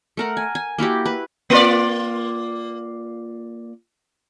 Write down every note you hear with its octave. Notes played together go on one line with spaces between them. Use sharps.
A3 A#4 F#5
G#5
G#5
A#3 E4 F#4 G4
B4
A#3 F4 D5